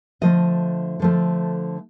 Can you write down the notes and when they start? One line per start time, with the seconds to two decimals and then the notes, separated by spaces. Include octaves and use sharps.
0.21 D3 F3 A3 D#5
1.00 D3 F3 A3